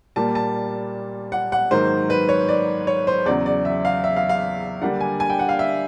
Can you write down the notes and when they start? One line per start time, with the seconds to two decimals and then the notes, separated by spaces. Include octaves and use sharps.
0.16 A#2 G3 A#3 A5
0.35 A5
1.32 F#5
1.52 F#5
1.71 G#2 D#3 F#3 A#3 C5
2.10 B4
2.29 C#5
2.48 D5
2.87 C#5
3.07 C5
3.26 E2 C#3 F#3 D5
3.46 D5
3.65 E5
3.85 F5
4.04 E5
4.16 F5
4.29 F5
4.81 D3 G3 A#3 D4 F#5
5.01 G#5
5.20 G#5
5.30 G5
5.39 F#5
5.49 F5
5.59 E5